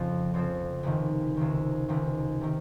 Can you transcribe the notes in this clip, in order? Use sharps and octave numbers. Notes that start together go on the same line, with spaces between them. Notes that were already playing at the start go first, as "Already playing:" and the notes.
Already playing: F2 C#3 F3 C4
F2 C#3 F3 C4
C#2 C3 D#3
C#2 C3 D#3
C#2 C3 D#3
C3 D#3